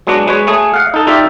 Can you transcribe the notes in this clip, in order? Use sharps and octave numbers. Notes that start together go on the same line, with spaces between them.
F#3 G#3 B3 D4 F#4
G#3 B4 C#5
A3 G#4
F5 F#5
D#4 A4
D#4 F4 G4 D5 E5